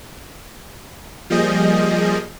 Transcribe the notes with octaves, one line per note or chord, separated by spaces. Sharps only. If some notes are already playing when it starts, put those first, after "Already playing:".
F3 G3 A#3 G#4 D#5 G6